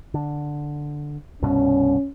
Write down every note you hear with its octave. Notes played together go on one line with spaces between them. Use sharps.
D3
C2 G2 B2 C#4